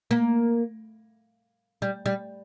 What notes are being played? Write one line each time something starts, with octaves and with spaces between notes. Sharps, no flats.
A#3
G3
G3